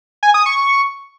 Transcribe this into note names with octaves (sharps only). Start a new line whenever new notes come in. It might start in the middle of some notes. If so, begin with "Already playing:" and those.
G#5
D#6
C#6